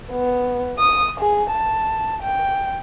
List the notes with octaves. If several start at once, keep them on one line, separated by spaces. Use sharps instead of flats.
B3
D#6
G#4
A5
G5